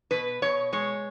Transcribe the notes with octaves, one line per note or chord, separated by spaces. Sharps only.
B2 B4
B2 C#5
G#3 C#5